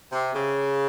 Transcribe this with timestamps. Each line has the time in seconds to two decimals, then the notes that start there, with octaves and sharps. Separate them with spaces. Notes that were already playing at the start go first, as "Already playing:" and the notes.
0.12 C3
0.35 C#3